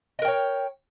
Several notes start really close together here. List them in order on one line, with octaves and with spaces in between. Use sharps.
D#5 A#4 G5 C#5